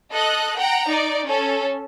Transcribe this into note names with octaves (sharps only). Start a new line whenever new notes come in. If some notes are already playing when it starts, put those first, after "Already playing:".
A4 D#5 F#6
F#5 G5 A#5
D#4 D5
C#4 A4